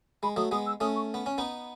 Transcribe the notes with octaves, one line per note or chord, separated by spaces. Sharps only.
G#3 B5
F#3 A3 D#6
G#3 B3 D#6
E6
A3 C#4 D#6
C#6
B3
C#4
B3 D#4